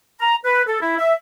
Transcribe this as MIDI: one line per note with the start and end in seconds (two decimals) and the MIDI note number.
0.20 0.36 82
0.44 0.62 71
0.67 0.78 69
0.81 0.95 64
0.99 1.13 76